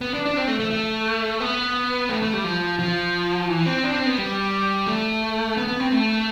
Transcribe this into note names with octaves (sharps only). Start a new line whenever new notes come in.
B3
D4
D4
C4
A3
A3
A3
B3
A3
A3
G3
F3
F3
E3
C4
D4
C4
B3
G3
A3
B3
B3
C4
A3